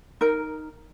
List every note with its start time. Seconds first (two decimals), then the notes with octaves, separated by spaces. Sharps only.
0.21 D#4 A#4